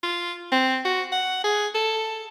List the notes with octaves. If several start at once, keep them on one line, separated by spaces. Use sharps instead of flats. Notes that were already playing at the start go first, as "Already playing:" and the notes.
F4
C4
F#4
F#5
G#4
A4